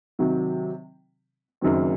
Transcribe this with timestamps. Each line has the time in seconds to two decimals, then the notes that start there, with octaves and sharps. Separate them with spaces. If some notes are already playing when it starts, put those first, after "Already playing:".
0.19 C3 D#3 F#3
1.61 F#1 F#2 D#3 F#3 C4